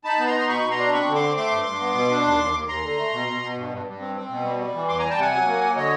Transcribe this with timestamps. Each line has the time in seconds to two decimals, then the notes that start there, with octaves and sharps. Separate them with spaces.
0.04 D#4 A5 B5
0.19 B3
0.27 A#5 C6
0.34 D#4
0.40 C6
0.48 B2 B5 C#6
0.63 B2
0.70 A#5 C6
0.78 D4
0.92 C4 B5 C#6
1.07 D3
1.15 C6 D6
1.22 C4
1.37 A3 C6 D6
1.51 G2
1.66 G2
1.80 B3
1.95 B2
2.10 D4
2.25 D#2
2.40 D#2
2.54 D#2
2.68 D#2 A#5 C6
2.83 D3
2.97 A3
3.12 B2
3.27 B2
3.42 B2
3.57 G2
3.71 G2
3.86 G2
4.00 C4
4.15 C4
4.30 B2
4.44 G3
4.59 G3
4.74 E3
4.88 E2 C6 D6
4.99 G3 G#5 A#5
5.10 G5 A5
5.18 C3 F#5 G#5
5.32 F#3
5.46 A#3
5.61 F#3
5.76 D3 C#5 D#5